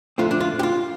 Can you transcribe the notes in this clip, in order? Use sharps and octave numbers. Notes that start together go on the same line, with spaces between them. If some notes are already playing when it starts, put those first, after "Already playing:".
F2 D3 A3 C4 F4
D4
F4
G4
F4